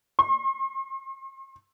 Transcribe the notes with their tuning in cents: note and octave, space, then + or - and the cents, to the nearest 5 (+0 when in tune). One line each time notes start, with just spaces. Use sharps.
C6 +45